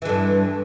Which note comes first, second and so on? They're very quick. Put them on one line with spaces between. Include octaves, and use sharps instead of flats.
E3 D3 G2